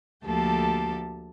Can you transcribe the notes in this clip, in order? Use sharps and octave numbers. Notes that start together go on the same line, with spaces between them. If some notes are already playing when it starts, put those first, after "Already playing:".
D2 F3 A#3 G4 A4 A5